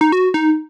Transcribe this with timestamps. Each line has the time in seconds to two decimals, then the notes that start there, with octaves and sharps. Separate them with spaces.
0.01 D#4
0.12 F#4
0.34 D#4